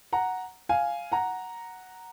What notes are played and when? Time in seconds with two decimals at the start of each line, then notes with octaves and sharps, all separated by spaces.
0.13 F#5 A#5
0.69 F5 G#5
1.12 F#5 A#5